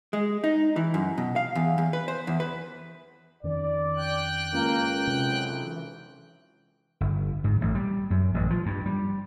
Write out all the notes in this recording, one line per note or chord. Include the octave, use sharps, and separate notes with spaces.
G#3
D#4
E3
F#2
B2
F5
E2
E2
B4
C5
E2
B4
F2 D#3 C#4 D5
G5 F#6
C#2 A#3
B1 F#2 C3
E3
G1
G#2
A1
G3
F#2
A1
F3
G2
G3